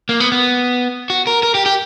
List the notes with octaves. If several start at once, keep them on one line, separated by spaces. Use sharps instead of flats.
A#3
B3
B3
F#4
A#4
A#4
G4
G4